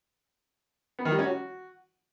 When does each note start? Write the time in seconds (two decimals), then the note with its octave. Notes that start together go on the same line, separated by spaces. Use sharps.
0.99 B3
1.05 D#3
1.12 G3
1.19 C#4
1.25 F#4